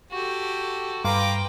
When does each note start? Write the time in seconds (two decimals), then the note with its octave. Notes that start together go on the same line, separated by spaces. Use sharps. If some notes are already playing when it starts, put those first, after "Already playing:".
0.11 F#4 G4 A4
1.05 G2 B4 F5 G5 A#5 C6 D6